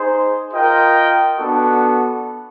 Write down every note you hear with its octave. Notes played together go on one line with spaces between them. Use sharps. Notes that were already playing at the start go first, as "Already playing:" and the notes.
Already playing: D#4 G#4 C5
F4 A#4 D#5 G5
B3 D4 F#4 A4